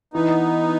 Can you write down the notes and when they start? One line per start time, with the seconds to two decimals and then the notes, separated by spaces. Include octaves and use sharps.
0.14 E3 B3 D#4